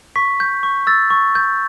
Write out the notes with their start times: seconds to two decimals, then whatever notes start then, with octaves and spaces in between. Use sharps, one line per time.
0.16 C#6 B6
0.40 G6
0.63 C#6
0.87 E6 A6
1.10 C#6
1.35 G6